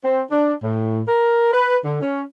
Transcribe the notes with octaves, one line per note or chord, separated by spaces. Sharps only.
C4
D4
A2
A#4
B4
D3
C#4